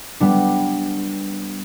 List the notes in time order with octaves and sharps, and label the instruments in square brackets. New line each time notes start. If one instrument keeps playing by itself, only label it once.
[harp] G3 B3 D4